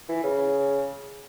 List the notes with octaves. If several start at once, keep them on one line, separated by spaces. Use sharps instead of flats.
E3
C#3